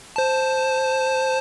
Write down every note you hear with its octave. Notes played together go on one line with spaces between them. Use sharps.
C5 A5